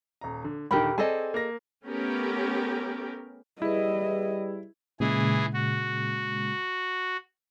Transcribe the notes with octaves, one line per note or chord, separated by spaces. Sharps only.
D#1 A#5
D3
D#1 D3 D#3 G4 A#4 B5
C4 G#4 A4 D5 D#5 G#5
A#3 A#6
A3 B3 C#4 G4 A#4
G3 E4 G#4 B4 D#5
A#2 C#3 E3 G#3 G#4
F#4